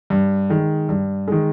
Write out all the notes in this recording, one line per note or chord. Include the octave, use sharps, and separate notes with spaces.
G2
D#3 G#3
G2
D#3 G#3